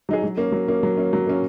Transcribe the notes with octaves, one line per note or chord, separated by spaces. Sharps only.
F#3 D#4 G#4
F#3
A#3 C#4
F#3
A#3 C#4
F#3
A#3 C#4
F#3
A#3 C#4